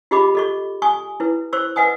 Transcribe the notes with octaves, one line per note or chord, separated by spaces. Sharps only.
F4 G4 G#4 D#5 B5 D6
A4 D#5 C#6
G#5 C#6 D#6
E4 B4
C5 C#6 E6
B4 D#5 F#5 G#5 D#6